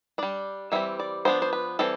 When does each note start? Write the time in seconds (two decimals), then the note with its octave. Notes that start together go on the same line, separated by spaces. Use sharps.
0.18 G3 D4 D5
0.72 E3 G3 C4 E5
1.00 D5
1.25 F3 B3 D4 C5
1.42 C5
1.53 B4
1.79 E3 G3 C4 A4